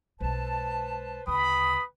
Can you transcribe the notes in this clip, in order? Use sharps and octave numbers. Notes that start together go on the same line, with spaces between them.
B1 G#3 B4 C5 A5
D2 C#3 B4 G5 B5 D#6